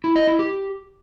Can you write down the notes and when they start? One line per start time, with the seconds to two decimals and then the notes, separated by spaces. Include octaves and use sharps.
0.04 E4
0.16 D#5
0.27 E4
0.39 G4